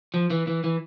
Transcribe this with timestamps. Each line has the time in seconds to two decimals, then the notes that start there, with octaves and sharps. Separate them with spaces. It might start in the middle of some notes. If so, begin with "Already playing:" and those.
0.14 F3
0.30 E3
0.47 E3
0.64 E3